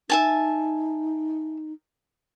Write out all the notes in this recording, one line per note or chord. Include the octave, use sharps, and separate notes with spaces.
D#4 E5 G#5 A5